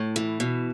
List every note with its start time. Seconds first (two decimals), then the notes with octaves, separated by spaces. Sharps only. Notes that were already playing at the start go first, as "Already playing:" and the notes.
Already playing: A2
0.16 E3
0.40 B2